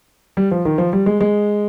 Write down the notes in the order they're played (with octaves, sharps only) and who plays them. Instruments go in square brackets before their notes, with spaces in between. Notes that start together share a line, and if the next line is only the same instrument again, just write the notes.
[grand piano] G3
F3
D#3
F3
G3
G#3
G#3